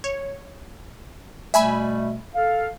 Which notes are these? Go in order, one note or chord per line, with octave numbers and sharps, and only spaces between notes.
C#5
B2 G3 A3 E5 G#5 B5
A4 F5